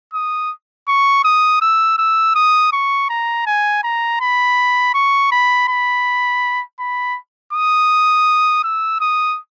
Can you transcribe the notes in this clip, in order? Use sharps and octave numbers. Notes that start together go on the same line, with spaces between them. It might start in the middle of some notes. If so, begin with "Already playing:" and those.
D#6
C#6
D#6
E6
E6
D#6
C#6
A#5
G#5
A#5
B5
C#6
B5
B5
B5
D#6
E6
D#6